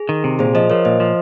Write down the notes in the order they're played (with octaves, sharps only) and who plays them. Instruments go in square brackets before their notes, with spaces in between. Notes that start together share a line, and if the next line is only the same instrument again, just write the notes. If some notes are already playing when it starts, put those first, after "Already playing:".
Already playing: [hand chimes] G#4
[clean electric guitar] D#3
C3
[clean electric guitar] A#2 [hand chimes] G#4 C5
[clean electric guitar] F3 [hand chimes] C5 D#5
[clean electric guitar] F3 [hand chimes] A#4 C#5
[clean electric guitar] A#2 [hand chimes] C5 D#5
[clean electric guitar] F3